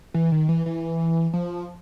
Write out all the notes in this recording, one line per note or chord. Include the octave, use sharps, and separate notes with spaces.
E3
D#3
E3
E3
F3